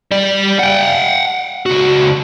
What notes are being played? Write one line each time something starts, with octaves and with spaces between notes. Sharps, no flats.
G3 D5
F#5 G5
C#2 F#4